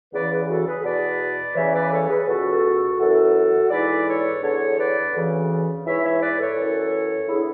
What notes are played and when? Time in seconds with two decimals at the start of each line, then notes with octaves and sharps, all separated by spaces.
0.12 E2 C#3 E3 B4 D5
0.31 G#4 B4
0.49 F#4 A4
0.66 G#4 B4
0.84 E2 B2 B4 D5
1.55 E2 C#3 E3 C#5 E5
1.74 B4 D5
1.92 A4 C#5
2.09 G#4 B4
2.27 C#2 B2 F#4 A4
2.99 F#2 E3 F#4 A4
3.70 G#2 E3 B4 D5
4.06 A4 C#5
4.42 E2 D3 A4 C#5
4.78 B4 D5
5.13 D2 C#3 E3
5.85 G#2 E3 C#5 E5
6.03 C#5 E5
6.21 B4 D5
6.39 A4 C#5
6.56 F#2 E3
7.28 E2 D3 E4 G#4